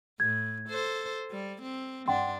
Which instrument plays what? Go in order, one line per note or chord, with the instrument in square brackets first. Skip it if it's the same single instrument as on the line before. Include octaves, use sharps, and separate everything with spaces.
[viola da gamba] A2 [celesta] G#6
[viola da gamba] A4 C5
G3
C4
[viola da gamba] G2 D4 [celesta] F#5 G5 C6